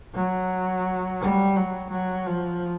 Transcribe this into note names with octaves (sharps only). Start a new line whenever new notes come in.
F#3
G3
F#3
F#3
F3